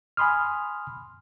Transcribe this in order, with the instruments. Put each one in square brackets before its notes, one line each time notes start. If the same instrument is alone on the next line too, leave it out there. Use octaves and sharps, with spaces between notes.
[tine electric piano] G#5 B5 C6 D#6 F6